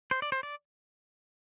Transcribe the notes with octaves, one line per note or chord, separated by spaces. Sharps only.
C5
D5
C5
D5